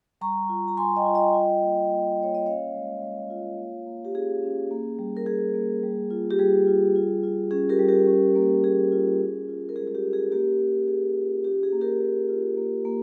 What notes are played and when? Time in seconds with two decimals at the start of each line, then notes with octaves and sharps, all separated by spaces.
0.21 G3 A#5 C#6
0.49 F4
0.68 A#5
0.77 G3 G#5 C6
0.96 D#5 G5
1.05 F4
1.15 D#5 G5
1.34 F4
1.62 A#3
1.90 A#3
2.18 A#3 C#5
2.35 D#5
2.46 C#4 C#5 F5
2.74 G#3
3.02 G#3
3.30 F4
3.58 A#3
3.86 A#3
4.05 G4
4.14 C#4 G#4
4.42 C#4
4.71 A#3
4.99 G3
5.17 A#4
5.26 G3 G#4
5.54 A#3
5.83 G3
6.10 F4
6.31 G4
6.39 G3 G#4
6.67 F4
6.96 F4
7.23 F4
7.51 C#4 G#4
7.69 G4 A#4
7.79 G3
7.88 G4 A#4
8.07 C#4
8.36 A#3
8.63 A#3 G#4
8.92 F4
9.20 C#4
9.48 F4
9.69 A#4
9.76 G#3 G#4
9.87 G#4
9.95 G4
10.04 C#4
10.13 G#4
10.32 A#3 G4 A#4
10.61 A#3
10.88 A#3 G#4
11.17 F4
11.44 C#4 G4
11.63 G#4
11.73 A#3
11.81 G4 A#4
12.00 A#3
12.29 F4
12.57 A#3
12.85 A#3